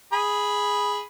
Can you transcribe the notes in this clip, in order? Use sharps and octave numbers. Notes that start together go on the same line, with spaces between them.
G#4 B5